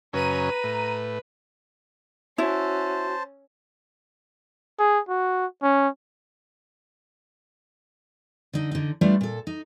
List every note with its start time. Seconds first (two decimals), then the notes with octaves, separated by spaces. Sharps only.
0.13 F#2 C#3 C#4 B4 A#5 D#7
0.64 A2
2.38 C#4 E4 F#4 C5 A5
4.79 G#4
5.09 F#4
5.63 C#4
8.53 D3 D#4
8.72 D3 D#4
9.01 G3 A3 B3 D4 F4
9.21 A#2 A4
9.47 D#4